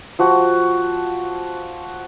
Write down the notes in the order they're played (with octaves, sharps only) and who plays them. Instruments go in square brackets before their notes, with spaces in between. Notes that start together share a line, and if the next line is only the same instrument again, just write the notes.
[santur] F3 F#4